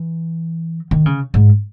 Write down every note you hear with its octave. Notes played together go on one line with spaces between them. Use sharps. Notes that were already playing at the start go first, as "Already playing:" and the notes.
Already playing: E3
D#3
C#3
G#2